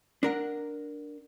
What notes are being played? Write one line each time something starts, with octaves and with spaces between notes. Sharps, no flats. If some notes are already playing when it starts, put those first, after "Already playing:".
D4 A#4 F#5